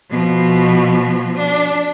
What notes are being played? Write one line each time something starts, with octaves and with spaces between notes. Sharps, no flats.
B2 F3
D4